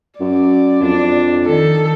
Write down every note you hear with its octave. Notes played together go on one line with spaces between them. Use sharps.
F#2 D5
F2 D4
D#3 A4